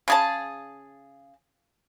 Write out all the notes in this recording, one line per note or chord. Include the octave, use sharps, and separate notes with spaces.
C#3 G#4 A5